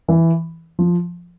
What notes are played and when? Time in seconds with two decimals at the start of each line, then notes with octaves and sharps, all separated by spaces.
0.08 E3
0.79 F3